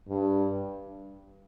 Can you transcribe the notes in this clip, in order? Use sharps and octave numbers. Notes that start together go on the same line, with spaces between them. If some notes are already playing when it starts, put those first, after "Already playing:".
G2